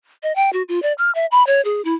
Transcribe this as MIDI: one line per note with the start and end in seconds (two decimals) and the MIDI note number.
0.23 0.35 75
0.36 0.50 79
0.53 0.63 66
0.69 0.81 65
0.83 0.93 74
0.98 1.11 89
1.15 1.26 76
1.31 1.45 83
1.47 1.61 73
1.65 1.82 68
1.85 1.95 64